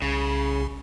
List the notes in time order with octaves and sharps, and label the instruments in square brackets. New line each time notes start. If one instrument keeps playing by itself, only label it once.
[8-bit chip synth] C2 [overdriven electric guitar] C#3